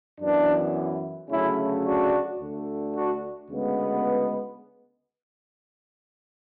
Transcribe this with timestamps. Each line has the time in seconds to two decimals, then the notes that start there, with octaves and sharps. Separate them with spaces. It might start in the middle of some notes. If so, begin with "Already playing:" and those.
0.20 F#2 E3 B3 D4
1.30 D2 C#3 F#3 A3 C#4 E4
1.85 D4 F#4
2.40 D2 D3 A3
2.95 D4 F#4
3.50 D2 C#3 G#3 B3